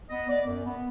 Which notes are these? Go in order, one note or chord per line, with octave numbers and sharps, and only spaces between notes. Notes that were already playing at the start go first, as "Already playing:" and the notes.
B3 D#5
B3 D5
F#2
B3